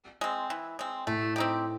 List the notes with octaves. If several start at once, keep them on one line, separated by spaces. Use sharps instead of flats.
G#3 C4
E3
G#3 C4
A2 A3
C4 D#4 G4